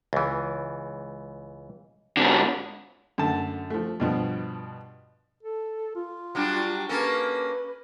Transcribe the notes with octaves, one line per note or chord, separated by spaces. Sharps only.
C#2 E3
G#2 D3
F#2 D3 A3 A5
F3 A3
G2 B2 F3
A4
F4
F#3 G3 D4
A#3 C#4 A4 B4